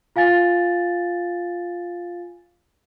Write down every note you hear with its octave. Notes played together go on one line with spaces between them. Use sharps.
F4 F5 G#5 A6